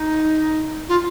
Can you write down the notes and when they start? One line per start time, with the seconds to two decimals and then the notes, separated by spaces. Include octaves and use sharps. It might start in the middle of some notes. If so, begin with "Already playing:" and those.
Already playing: D#4
0.89 F4